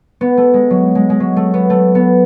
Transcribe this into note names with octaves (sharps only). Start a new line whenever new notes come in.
B3
A3
G#3
F#3
G#3
G#3
F#3
A3
B3
A3
B3